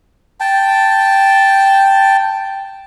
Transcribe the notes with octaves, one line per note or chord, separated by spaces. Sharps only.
G5 A5